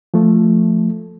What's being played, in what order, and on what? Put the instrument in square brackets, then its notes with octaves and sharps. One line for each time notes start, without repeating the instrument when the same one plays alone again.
[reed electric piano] F3 A3